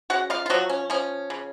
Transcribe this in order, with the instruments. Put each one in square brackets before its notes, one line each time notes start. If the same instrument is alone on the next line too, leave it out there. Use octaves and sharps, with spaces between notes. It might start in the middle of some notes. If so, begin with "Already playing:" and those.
[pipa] C#3 F#4 F#5
F4 F5
F4
F3 F#3 F#4
C#4
F3 C#4
C#3